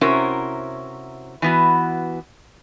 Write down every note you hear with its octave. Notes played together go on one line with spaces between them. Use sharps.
C3 C#4 E4 F#4 A#4 C5
E3 B3 F#4